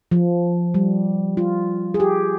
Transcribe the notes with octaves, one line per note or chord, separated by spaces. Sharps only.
F3
G3
F4
G#4
G4